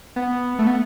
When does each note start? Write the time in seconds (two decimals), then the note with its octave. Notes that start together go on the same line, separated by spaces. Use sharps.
0.16 B3
0.59 A3
0.67 B3